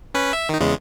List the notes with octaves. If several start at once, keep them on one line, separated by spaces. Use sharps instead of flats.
C#4 B4
E5
D#3 D#4
E2 C#3 G#3